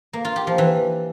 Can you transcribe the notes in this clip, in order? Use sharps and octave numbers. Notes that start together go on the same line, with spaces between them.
A#3
F4
G4
F3
E3